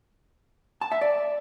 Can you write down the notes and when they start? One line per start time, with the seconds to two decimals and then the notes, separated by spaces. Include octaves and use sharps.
0.81 A5
0.91 E5
1.01 D5